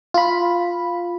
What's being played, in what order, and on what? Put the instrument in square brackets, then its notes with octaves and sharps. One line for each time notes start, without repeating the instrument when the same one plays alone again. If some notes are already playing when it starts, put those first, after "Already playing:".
[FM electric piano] F4 B5